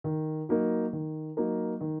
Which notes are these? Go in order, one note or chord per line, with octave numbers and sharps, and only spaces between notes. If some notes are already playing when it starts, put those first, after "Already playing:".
D#3
F#3 A#3 D#4 A#4
D#3
F#3 A#3 D#4 A#4
D#3